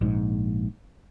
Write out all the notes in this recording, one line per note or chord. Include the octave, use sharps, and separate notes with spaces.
A#1 G#2